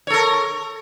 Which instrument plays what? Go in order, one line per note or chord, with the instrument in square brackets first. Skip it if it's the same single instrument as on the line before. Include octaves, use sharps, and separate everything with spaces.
[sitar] C#5
A4
A#4